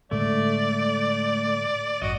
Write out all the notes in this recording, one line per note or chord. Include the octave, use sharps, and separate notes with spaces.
A2 D3 G#3 A3 D5
A1 G2 F#4 D#5